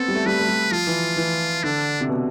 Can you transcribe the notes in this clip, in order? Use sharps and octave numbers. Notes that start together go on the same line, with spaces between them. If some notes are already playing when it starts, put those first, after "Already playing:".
Already playing: B3 C4 A4
G3
A3
G3 B4
A3
G3
F3 F4
E3
E3
D3 D4
C3
B2